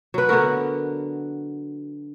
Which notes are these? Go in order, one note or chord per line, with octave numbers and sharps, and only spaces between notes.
F#3 B4
D3 B3 F#4 A#4